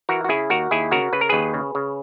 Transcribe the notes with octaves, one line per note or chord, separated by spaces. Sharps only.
E3 F#4 A#4
F#4
C#3 E4 G#4
D#2 F#4 A#4
D#2 E4 G#4
C#3 F#4 A#4
C#3 B4
A#4
D#2 G#4 B4
C#3
C#3